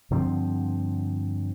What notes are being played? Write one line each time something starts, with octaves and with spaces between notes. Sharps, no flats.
G2 D3 F3 C4